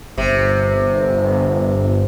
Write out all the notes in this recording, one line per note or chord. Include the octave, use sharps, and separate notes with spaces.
G1 C3